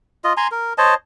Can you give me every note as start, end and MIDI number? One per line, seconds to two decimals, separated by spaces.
0.24 0.33 65
0.24 0.33 75
0.37 0.47 80
0.37 0.47 82
0.37 0.47 84
0.51 0.73 70
0.78 0.94 72
0.78 0.94 73
0.78 0.94 75
0.78 0.94 81